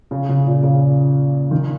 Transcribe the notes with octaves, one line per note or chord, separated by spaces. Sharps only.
C#3
C#3
A#2
C#3
D#3